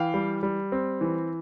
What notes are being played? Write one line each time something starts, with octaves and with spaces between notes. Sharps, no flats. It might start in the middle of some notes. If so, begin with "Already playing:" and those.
Already playing: E3 F5 G5
G3
G3
C4
E3